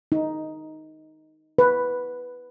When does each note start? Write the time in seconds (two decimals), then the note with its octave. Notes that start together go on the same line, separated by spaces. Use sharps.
0.12 D#4
1.58 B4